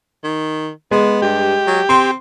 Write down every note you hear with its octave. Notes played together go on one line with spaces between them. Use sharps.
D#3
G#3 B3
G2 G4
F#3
C4 C6